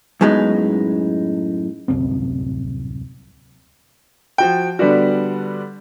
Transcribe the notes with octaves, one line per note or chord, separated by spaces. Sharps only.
F#2 A2 G#3 B3 D#4
D1 C2 F#2 C4
F3 F#4 G5
D3 G3 B3 D4 F#4